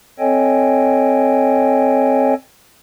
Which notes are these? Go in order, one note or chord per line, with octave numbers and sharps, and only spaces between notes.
C4 A4 C#5 D#5 G5 G#5